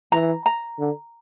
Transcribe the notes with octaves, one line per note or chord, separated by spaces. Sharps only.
E3 A#5
A#5
D3